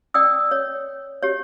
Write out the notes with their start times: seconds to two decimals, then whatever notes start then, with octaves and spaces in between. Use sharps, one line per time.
0.14 D5 G5 D#6 E6
0.51 C#5
1.22 G4 C#5